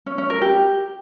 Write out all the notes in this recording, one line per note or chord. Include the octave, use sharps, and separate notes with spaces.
C#4
C#4
A#4
G4